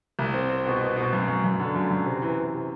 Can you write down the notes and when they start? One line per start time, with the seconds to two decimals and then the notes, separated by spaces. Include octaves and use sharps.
0.19 C2
0.34 C4
0.49 C4
0.66 B2
0.81 B2
0.96 B2
1.13 F#2
1.28 F#2
1.44 F#2
1.60 D3
1.76 F#2
1.91 F#2
2.06 C3
2.22 E3
2.38 E3
2.54 C3